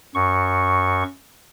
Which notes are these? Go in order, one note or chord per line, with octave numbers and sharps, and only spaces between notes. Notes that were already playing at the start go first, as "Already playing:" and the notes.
F#2 C#6